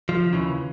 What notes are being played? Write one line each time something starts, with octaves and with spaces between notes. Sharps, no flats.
F3
D#2 C#3 E3